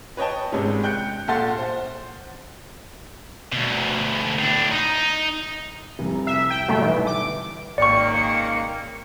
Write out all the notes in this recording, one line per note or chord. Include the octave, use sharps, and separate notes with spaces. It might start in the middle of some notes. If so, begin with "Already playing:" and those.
B4 C#5 D#5 G5 A5
G#1 G#2 C3 G#3 C#4
G5 F#6 G6 C#7
A#1 F4 A4 F#5 C6 A6
C5
D2 B2
A2 D4
D#4
F1 C2
E5
G5
B1 G2 D3 A3
E3
D6
G#1 C#2 D#3 A#3 D5 G5 C#6 C#7